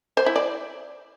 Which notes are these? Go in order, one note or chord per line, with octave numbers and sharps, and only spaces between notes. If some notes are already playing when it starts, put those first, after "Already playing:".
C5
E4
D5